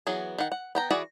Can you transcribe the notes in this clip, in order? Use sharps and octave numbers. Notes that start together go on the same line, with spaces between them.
E3 F#3 B3 G#4
D#3 F#5
F#5
B3 G5 A#5
E3 F#4 G#4 B4 D5